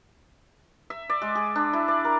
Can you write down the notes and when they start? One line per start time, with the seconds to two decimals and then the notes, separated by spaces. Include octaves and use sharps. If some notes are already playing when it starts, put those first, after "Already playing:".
0.90 E5
1.10 D5
1.22 G#3
1.35 G#4
1.56 D4
1.73 E4
1.88 D5
2.05 A#4